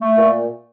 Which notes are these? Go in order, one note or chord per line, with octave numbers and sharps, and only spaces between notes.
A3
A#2